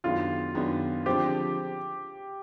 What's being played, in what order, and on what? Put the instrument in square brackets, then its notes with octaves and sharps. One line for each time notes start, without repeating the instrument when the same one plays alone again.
[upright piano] F#2 D#3 G#3 B3 D4 [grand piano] F4
[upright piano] F#2 D#3 G#3 B3 D4
[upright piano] D3 F3 G#3 C4 [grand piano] G4